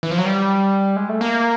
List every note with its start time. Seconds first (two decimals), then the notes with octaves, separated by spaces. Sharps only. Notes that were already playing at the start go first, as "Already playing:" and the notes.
0.03 E3
0.11 F3
0.18 F#3
0.25 G3
0.96 G#3
1.09 A3
1.21 A#3